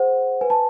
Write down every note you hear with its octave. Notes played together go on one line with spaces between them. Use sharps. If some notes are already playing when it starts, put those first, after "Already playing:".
Already playing: G#4 C5 F#5
B4 G#5
A5